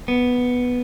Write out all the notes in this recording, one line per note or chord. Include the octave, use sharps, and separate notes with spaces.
B3